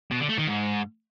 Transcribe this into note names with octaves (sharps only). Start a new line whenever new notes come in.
B2
D3
A3
D#3
G#2